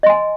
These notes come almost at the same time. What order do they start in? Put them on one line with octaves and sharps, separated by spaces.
D#5 C6 G#5